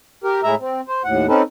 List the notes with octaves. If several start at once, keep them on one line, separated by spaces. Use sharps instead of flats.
G4 A#4
A2 G#3 E4 E5 A#5
C4
C5
D#2 A2 F#5
C4 C#4 D#4 A4 B4